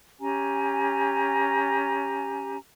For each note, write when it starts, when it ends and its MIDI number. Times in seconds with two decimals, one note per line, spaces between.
0.20 2.57 61
0.20 2.57 67
0.20 2.57 80
0.20 2.57 82